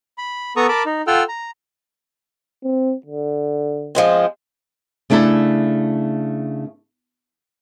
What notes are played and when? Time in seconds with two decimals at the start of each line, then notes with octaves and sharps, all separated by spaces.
0.18 B5
0.57 B3 A4 A#5 C#6 D#6
0.69 A#4 A5 B5 D6
0.86 D#4
1.07 F4 A4 F#5 G5 E6 F6
1.29 A#5
2.64 C4
3.06 D3
3.95 F3 G#3 C4
5.10 C#3 A3 D4 E4 A4